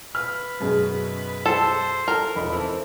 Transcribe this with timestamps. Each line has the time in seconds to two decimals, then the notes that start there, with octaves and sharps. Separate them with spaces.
0.15 B4 F6
0.60 F#2 B2 G#4
1.46 A4 C5
2.08 A4 A#4
2.35 E1 A#2 D#4 B5
2.52 E3 C4 A4